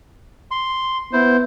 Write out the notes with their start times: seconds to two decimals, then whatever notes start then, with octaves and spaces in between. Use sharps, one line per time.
0.51 C6
1.13 B3 E4 C5